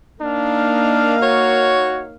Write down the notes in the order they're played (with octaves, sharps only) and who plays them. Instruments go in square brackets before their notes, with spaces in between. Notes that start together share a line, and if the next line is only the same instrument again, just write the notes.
[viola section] A#3 D#4 F5 [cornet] D4
[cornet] F#4 [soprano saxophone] C#5